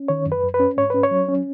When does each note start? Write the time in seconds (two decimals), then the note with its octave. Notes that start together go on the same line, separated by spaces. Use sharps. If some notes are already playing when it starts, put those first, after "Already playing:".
Already playing: C#4
0.08 D#3 C#5
0.26 F#2
0.32 B4
0.43 F#2
0.54 B4
0.60 C#4
0.77 G#2 C#5
0.90 C#4 B4
1.03 C#5
1.11 F#3
1.28 C#4